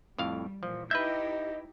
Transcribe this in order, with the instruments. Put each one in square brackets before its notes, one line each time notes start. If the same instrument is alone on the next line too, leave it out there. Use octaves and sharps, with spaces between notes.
[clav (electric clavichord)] F2 A2 F5 [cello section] G3
[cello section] A#2 E3 [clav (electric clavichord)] F3
[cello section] D#4 E4 G4 [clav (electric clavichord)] B4 E5 [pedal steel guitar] D#5 G6